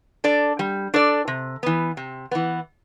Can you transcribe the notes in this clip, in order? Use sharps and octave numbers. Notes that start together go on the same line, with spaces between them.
D4 A4 D5
G3
D4 A4 D5
C3
E3 B3
C3
E3 B3